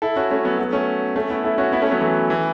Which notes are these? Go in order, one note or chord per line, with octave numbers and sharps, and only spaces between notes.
E4 A4
C#4 F#4
A3 C#4
F#3 B3
F#3 B3
A3 C#4
A3 C#4
B3 E4
E4 A4
C#4 F#4
B3 E4
A3 C#4
F#3 B3
E3 A3
E3